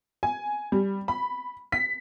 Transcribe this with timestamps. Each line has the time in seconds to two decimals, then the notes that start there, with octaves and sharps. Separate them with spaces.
0.23 G#5
0.72 G3
1.08 B5
1.72 B6